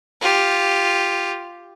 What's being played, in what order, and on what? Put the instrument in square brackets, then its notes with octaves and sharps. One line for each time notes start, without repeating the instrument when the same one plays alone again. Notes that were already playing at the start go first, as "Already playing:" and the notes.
[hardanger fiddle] F4 G4